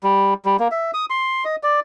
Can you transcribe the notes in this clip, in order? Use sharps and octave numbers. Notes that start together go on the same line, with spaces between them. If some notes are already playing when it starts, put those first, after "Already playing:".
G3
G3
A#3
E5
D#6
C6
D#5
D5